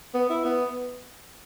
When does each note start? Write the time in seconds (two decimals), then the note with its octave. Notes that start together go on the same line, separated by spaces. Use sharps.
0.14 B3
0.29 E4
0.45 B3